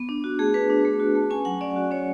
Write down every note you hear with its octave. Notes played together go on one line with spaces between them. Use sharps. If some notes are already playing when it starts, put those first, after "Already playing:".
Already playing: B3
D4
F#4
A3 G#4
D4 B4
D4
A3
F#4
A3
C#4 G#5
F#3 F#5
C#4 D5
F#4
C#4 C#5